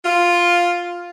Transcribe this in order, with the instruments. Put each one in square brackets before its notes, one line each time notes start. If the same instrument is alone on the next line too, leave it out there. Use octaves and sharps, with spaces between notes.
[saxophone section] F4